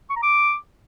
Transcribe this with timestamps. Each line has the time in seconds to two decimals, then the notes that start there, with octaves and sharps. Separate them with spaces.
0.10 C#6
0.16 A#5
0.23 D6